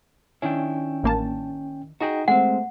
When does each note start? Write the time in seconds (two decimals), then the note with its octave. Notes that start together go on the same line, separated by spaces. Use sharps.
0.42 D#3 C#4 D4 E4 G5
1.04 A1 A#3 A5
2.00 D#4 F#4 G#4 D#5 G5
2.28 G#3 A3 C4 F#5